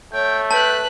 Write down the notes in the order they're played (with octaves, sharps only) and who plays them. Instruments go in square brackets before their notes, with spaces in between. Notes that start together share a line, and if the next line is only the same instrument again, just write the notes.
[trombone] A3 [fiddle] C#5 [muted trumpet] G5
[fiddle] B4 F#6 [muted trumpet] G5 [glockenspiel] A5